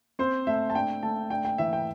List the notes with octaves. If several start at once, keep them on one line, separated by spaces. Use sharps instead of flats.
C4 C5
A3 E5
A5
D4 G5
A3 A5
D4 G5
G5
E3 E5
G5